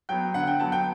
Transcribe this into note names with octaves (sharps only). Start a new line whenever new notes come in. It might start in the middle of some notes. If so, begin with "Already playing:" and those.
F#3 B3 G5
D3 F#5
G5
F#3 B3 A5
G5